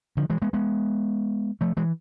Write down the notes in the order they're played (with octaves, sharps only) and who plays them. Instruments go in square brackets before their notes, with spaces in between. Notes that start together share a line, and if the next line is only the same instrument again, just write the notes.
[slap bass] D3 F3
E3 G#3
G#3 B3
G#3 B3
F3 A3
E3 G#3